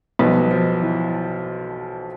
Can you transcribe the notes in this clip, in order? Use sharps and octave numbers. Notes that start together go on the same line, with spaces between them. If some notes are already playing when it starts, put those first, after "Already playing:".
B1 B2 F3 G3 B3 D#4
F3
E3